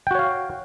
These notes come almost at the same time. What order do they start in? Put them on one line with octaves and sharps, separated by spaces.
G5 F#4 C#5 F5